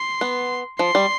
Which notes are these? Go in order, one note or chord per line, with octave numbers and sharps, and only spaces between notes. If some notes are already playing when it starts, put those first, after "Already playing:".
Already playing: C6
B3
F3 C6
G3